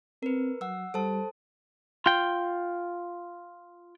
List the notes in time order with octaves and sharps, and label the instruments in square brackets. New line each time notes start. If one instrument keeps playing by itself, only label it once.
[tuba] C4 [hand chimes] A#4 B4
[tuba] F#3 [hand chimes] F#5 E6
[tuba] G3 [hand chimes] A4 C5 A5
[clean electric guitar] F4 G5